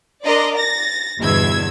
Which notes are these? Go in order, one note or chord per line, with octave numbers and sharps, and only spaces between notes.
D4 A#4 D5 D#5 C6
A6 A#6
G1 E2 B2 E6 G#6